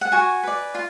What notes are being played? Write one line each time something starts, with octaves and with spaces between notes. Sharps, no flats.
F#5
F#4 G#5
B4 D5
F4